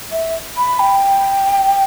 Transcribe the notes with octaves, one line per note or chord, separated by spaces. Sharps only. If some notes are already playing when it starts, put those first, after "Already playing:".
E5
B5
G5